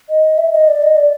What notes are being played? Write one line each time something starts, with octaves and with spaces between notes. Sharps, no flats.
D#5
E5
D#5
D5
D#5
D5